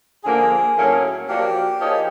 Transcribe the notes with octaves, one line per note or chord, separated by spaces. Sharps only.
D3 F3 A#3 G#4
A2 F#3 A#3 C#4
F3 A#3 D4 F#4 G4
F3 A#3 D#4 G#4 C#5